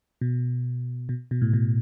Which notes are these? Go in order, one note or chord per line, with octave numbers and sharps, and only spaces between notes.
B2
B2
B2
A2
B2